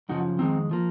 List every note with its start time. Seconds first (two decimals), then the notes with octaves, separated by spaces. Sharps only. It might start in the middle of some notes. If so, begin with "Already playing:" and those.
0.09 F#2 C#3 F3 D#4 F#4
0.39 F2 D#3 G#3 C4 D#4
0.71 F3 A#3